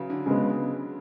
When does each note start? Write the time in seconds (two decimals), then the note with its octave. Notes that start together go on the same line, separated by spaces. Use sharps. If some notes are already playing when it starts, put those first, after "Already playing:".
Already playing: C#3 E3 F#3
0.10 D3
0.26 C#3 G#3 B3